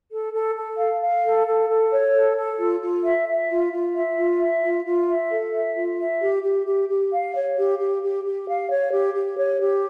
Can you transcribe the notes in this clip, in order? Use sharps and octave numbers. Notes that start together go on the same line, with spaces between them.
A4
A4
A4
F5
F5
A4
A4
A4
C#5
A4
A4
F4
F4
E5
E5
F4
F4
E5
F4
E5
F4
F4
E5
A4
E5
F4
E5
G4
G4
G4
G4
F5
C#5
G4
G4
G4
G4
F5
C#5
G4
G4
C#5
G4